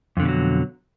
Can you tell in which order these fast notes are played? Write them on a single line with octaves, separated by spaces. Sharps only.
F2 D3 B2 G3 F#3